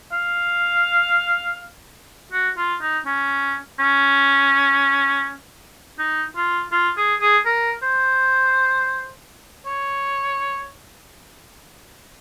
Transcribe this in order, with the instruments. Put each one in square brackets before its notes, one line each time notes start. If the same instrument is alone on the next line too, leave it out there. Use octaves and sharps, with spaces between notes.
[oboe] F5
F#4
F4
D#4
C#4
C#4
D#4
F4
F4
G#4
G#4
A#4
C5
C#5